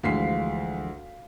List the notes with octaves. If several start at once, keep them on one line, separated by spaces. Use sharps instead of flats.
D2 E3 F3 G#3 F5 B6 C7